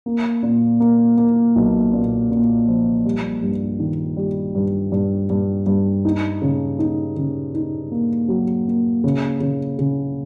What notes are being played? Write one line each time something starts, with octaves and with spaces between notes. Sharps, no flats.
A#3
A#2
A#3
A#3
B1
A#2
A#2
F3
G3
G2
D#3
G3
G2
G2
G2
G2
D#4
C#3
D#4
C#3
D#4
A#3
F#3
A#3
C#3
C#3
C#3